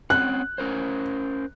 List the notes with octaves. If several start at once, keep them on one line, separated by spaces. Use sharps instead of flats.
C4 C#4 F#5 F#6
C#4 A#4 C5